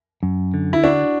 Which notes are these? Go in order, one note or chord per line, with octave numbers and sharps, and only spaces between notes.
F#2
D3
E4
D4 F#4